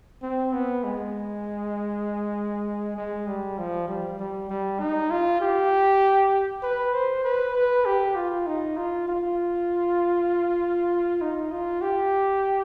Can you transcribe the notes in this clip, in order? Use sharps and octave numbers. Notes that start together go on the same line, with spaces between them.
C4
B3
G#3
G#3
G3
F3
G3
G3
G3
D#4
F4
G4
B4
C5
B4
B4
G4
F4
D#4
F4
F4
D#4
F4
G4